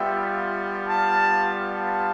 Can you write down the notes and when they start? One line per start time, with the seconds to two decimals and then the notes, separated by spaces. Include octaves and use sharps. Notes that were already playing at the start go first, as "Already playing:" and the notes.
Already playing: G3 B3 F4 E5 G5
0.89 F5 A5
1.72 F5 A5